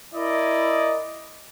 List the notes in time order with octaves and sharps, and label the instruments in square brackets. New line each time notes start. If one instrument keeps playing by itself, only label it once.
[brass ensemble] E4 A#4 D5 D#5